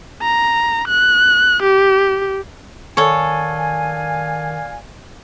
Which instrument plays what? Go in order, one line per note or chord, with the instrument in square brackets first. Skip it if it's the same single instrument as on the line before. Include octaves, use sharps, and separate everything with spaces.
[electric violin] A#5
F#6
G4
[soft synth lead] D#3 [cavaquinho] A4 C#5 [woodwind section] D5 F5 G#5